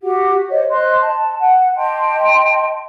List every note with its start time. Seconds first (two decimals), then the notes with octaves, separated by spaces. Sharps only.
0.02 F#4 G4 F#5
0.50 C5 C#5 D#5
0.70 C5 D#5 C6 F#6
1.01 A5
1.41 F#5
1.75 D#5 G5 A5 C6